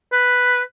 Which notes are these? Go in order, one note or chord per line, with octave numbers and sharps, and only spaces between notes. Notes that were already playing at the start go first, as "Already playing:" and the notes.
B4